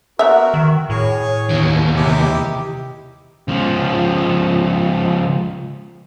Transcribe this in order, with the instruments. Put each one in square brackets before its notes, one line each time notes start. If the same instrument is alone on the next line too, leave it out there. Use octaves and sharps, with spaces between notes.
[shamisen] B3 E5 [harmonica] F#4 A#4
[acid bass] D#3
[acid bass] A2 [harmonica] G#4 C#5
[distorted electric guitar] D#2 E3
[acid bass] C3 [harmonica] D#4 E4 G4
[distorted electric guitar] C#2 F3